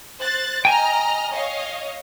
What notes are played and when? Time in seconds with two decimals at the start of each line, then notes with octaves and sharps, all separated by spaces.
0.19 C5 F#6 A6
0.65 D#5 G5 G#5 A#5 F6
1.31 C#5 D#5 F5